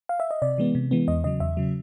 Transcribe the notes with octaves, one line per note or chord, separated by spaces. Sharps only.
F5
E5
D#5
C3 D5
E3 G#3 B3
C3
E3 G#3 B3
E2 D#5
C#3 F#3 D#5
E2 E5
C#3 F#3